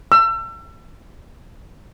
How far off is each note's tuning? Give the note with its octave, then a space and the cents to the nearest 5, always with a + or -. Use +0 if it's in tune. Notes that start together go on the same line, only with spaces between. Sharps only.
E6 +35